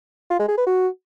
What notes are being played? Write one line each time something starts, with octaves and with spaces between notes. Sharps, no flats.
F4
G#3
G#4
B4
F#4